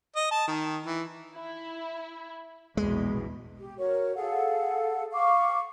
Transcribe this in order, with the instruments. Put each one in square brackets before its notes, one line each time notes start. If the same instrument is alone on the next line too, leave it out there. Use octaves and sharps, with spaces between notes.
[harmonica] D#5
A5
D#3
E3
[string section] E4
[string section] A#1 E2 B2 [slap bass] G#3
[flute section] G4
F#4 A#4 C#5
G#4 A4 F5 F#5
F5 C#6 D6